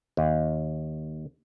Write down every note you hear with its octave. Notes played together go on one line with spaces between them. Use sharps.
D#2